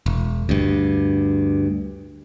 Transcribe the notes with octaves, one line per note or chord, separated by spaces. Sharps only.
E1
D2 G2